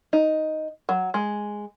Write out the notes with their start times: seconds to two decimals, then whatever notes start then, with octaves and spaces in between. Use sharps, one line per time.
0.13 D#4
0.89 F#3
1.14 G#3